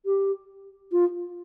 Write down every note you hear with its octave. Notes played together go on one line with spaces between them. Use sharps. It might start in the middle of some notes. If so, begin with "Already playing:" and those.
G4
F4